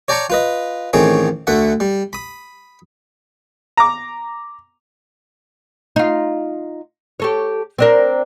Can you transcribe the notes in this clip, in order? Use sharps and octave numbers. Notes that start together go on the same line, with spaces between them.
C#5 D5 G5 A5 A#5 C#6
F4 B4 D#5
A1 D#3 A3 C4 G#4 C#5
D2 D3 A3 E5 F#5
G3
B5 D#6
A#5 D6
D#4 F4
G4 A4 C#5
C4 D4 A#4